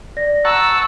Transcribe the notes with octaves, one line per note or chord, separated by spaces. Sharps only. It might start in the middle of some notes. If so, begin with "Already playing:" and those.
D5 A#6
F#5 A5 A#5 C#6 E6
E7